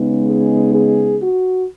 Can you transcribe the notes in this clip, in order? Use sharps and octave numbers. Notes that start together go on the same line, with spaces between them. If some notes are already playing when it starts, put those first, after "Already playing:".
Already playing: C#3 G#3 B3 D#4
G#4
G#4
F#4